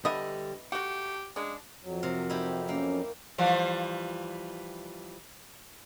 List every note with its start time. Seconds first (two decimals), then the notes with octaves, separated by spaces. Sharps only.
0.05 D3 E3 G3 B3 D#5 E5
0.72 A3 F#4 G4 F#5
1.36 C#3 G#3 D4
1.83 F2 F#3
2.03 C3 C4 A#4
2.30 D#4 E4 G4
2.69 A#3 C#4
3.38 E3 F3 G3